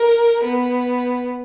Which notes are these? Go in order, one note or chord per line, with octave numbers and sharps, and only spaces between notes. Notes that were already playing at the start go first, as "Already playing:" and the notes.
Already playing: A#4
B3